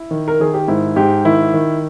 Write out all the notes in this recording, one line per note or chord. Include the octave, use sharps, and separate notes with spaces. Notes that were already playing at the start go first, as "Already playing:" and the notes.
Already playing: E4
D#3
A#4
D#3 G#4
G4
G#2 E4
G#2 G4
D#3 E4
D#3